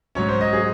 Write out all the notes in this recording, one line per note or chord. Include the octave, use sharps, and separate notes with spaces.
G#2 F#3 C#4 C#5
C5
D#5
G#4